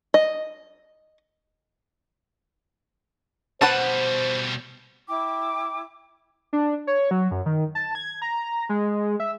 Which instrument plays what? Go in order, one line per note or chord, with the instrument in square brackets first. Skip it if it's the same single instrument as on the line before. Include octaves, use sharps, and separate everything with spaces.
[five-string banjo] D#5
[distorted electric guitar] B2 G3 [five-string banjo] B4 F#5 A5 [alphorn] C5
[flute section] E4 G5 D6
[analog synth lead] D4
C#5
F#3
F#2
D#3
A5
G#6
A#5
G#3
E5